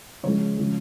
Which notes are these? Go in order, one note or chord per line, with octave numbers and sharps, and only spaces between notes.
C#3 F3 G#3 C#5
C#3 F3 G#3